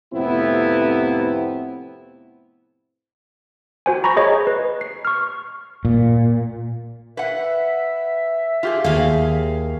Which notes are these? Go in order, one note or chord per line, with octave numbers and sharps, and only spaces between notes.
F2 A2 C3 B3 C4 E4
F#4 C5 G#5
A#5 B5 C#6 A#6
G#4 C5 C#5 D#5
B4
C7
C#6 F6
A#2
B4 E5 F#5
F4 G4 G#4
D#2 G#4 F5